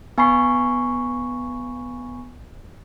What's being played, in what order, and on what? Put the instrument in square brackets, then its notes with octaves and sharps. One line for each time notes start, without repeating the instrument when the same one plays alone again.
[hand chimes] B3 G#5 B5 C#6 C7